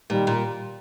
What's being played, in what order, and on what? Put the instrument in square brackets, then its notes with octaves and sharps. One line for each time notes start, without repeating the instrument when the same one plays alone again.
[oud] A#2 [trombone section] D#3 G3
[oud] A#2